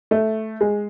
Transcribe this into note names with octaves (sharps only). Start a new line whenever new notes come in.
A3
G#3